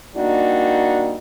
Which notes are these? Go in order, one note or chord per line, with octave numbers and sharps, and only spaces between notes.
G3 A#3 D4 D#4 F#4